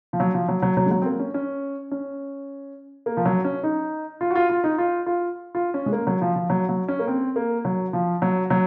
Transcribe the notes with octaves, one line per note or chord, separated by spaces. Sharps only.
F3
F#3
F3
F#3
F#3
F#3
G#3
F#3
C4
A#3
C#4
C#4
C#4
A#3
F3
F#3
C#4
D#4
F4
F#4
F4
F4
D#4
F4
F4
F4
C#4
G#3
A#3
F#3
F3
F3
F#3
F#3
C#4
A#3
C4
A#3
F#3
F3
F#3
F#3